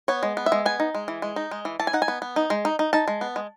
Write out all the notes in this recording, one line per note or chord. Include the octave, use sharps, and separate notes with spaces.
B3 C#5
G#3
B3
E5
G#3
B3 G#5
D#4
G#3
E3
G#3
D#4
G#3
E3
E3 A5
G#5
D#4 F#5
G#5
B3
B3
D#4
G#3
D#4
D#4
D#4 A5
G#3
B3
G#3